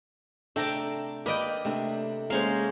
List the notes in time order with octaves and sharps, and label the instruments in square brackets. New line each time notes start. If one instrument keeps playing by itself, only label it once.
[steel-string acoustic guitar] C3 D4 [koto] A3 [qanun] G5 A#5 D6
[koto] A#3 D#5 G5 [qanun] B4 D5
[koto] C3 [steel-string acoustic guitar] A3 D4
[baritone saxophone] G#3 [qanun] A#3 C#4 C5 [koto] F5